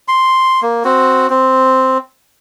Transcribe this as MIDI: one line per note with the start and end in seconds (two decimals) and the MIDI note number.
0.08 0.60 84
0.62 0.83 58
0.84 1.27 60
0.84 1.27 66
1.30 1.98 60